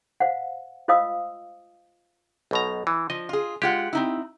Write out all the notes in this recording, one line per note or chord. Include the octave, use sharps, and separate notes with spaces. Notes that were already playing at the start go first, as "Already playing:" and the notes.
C5 F5 F#5
F4 C5 D#5 F5 D#6 E6
B1 B2 A#5
E3
F3 D#5
F4 G#4
G#3 F4 G4 F#5
C4 D#4 E4